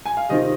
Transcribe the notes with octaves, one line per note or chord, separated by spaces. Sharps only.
G#5
F5
C3 D#3 C4 F4 D#5